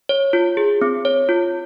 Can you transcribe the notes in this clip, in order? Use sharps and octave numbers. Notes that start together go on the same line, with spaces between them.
C#5
F4
G#4
C4
C#5
F4